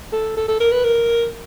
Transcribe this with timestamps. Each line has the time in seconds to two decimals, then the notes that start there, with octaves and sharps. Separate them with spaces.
0.12 A4
0.37 A4
0.48 A4
0.60 A#4
0.72 B4
0.84 A#4